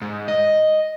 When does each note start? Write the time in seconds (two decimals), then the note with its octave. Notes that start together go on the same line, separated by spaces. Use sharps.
0.02 G#2
0.28 D#5